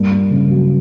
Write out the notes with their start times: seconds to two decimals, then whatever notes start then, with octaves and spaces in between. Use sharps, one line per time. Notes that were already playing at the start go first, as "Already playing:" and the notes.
Already playing: G2 A#3
0.11 A#3
0.31 C#3
0.50 F#3